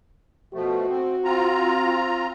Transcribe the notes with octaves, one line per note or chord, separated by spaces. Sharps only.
B2 F3 A3 F#4
C4
C4 F4 A#5